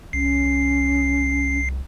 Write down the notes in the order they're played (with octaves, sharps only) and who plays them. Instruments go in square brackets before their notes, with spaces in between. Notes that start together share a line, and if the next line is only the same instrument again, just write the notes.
[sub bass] C2 [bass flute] C#4 [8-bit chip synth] C7